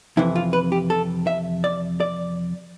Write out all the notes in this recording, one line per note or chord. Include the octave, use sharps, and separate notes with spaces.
F2 C3 E3 E4
F4
B4
G4
A4
E5
D5
D5